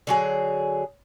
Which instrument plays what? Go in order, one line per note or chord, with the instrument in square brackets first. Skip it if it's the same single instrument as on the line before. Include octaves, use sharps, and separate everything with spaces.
[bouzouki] D3 F#3 G#4